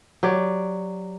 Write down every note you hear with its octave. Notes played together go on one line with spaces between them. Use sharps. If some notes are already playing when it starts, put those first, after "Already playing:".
F#3 G4 D5